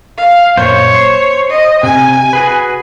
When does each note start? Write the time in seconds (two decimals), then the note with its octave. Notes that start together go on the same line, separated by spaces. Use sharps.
0.17 F5
0.57 F#2 A#2 C5 C#5
0.95 C5
1.50 D#5
1.83 C3 G#5
2.33 F#4 G#4 B4